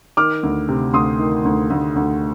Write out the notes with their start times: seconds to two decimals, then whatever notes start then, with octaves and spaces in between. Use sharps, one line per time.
0.17 D#3 D6 F6
0.43 D2
0.69 C3
0.93 D2 C6 D#6
1.20 D#3
1.45 D2
1.70 D2
1.96 D2